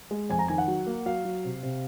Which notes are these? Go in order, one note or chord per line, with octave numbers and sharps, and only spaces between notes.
G#3
F2 G#5
A#5
D#3 G#5
F#5
F#3
A#3
F#3 F5
F#3
C3
C3